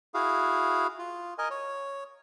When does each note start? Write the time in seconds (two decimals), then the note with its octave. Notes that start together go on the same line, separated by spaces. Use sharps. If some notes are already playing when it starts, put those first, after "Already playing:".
0.14 E4 F#4 G#4 F5
0.99 F4
1.38 A#4 D#5 G#5
1.50 C#5